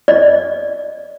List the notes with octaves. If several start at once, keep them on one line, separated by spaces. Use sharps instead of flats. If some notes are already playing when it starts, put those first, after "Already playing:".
D5 D#5